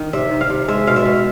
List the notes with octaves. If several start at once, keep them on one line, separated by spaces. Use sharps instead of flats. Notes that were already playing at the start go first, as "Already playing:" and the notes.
Already playing: D#3
C3 E5
D#3
F5
C3
G#3 E5
B2 F5
E5
B2